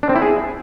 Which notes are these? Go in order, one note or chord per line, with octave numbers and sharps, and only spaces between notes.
D4
C4
E4
G#4